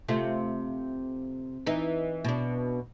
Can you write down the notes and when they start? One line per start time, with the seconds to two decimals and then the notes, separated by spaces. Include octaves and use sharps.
0.08 C3 A3 F4
1.66 E3 D#4
2.24 B2 D4